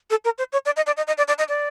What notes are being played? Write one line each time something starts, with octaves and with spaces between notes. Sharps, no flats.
A4
A#4
C5
C#5
D5
D#5
D5
D#5
D#5
D5
D5
D#5
D5